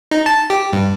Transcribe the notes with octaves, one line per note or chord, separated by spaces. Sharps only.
D#4
A5
G4
G2